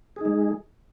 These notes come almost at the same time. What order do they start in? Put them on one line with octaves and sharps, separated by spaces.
G#4 D#4 G#3